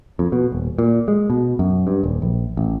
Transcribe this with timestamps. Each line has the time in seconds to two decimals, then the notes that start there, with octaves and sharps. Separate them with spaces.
0.19 F2
0.32 B2
0.52 D#1
0.78 A#2
1.08 G#3
1.30 B2
1.59 F#2
1.87 G2
2.03 D#1
2.22 A#1
2.57 A1